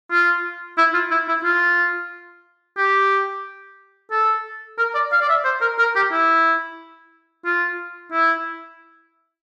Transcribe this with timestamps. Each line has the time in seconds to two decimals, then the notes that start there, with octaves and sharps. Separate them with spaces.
0.11 F4
0.78 E4
0.93 F4
1.11 E4
1.28 E4
1.44 F4
2.77 G4
4.11 A4
4.78 A#4
4.94 D5
5.12 F5
5.21 D5
5.29 E5
5.44 C5
5.61 A#4
5.79 A#4
5.96 G4
6.12 E4
7.45 F4
8.12 E4